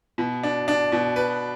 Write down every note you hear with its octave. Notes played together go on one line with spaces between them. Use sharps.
B2
D4
D4
B2
B4